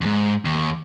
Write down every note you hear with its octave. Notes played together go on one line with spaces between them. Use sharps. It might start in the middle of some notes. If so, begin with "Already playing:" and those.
E2 G#2
D#2